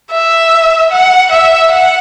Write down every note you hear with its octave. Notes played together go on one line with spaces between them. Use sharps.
E5
F#5
E5
F#5